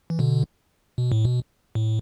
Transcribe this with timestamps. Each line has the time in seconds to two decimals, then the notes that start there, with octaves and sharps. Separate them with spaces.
0.10 E3
0.19 B2 D3
0.98 B2
1.12 A2
1.25 B2
1.75 A2